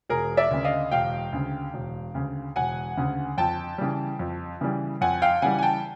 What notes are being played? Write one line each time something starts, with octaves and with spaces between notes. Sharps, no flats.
E1 G#4 A#4
D5 E5
D2 C#3
D#5 F5
E1 F5 G5
D2 C#3
E1
D2 C#3
E1 F#5 G#5
D2 C#3
F2 G5 A5
C#3 E3 G3
F2
C#3 E3 G3
F2 F#5 G#5
F5 G5
C#3 E3 G3 F#5 G#5
G#5
G5 A5